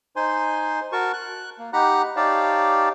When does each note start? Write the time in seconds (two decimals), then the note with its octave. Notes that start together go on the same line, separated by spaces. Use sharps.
0.16 D#4 C5 G#5 C6
0.92 F#4 A#4 A5 C#6
1.13 F#6
1.59 A#3
1.73 D#4 G4 F#5 A#5 B5 F#6
2.16 D#4 G4 C#5 D5 F5 A5